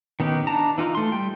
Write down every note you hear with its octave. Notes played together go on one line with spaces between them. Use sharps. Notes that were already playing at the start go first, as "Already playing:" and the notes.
D#3 B3 C#4 D#4 G4
D4 D#4 A5 A#5
E3 D#4 F4
A3 C6
G3 G5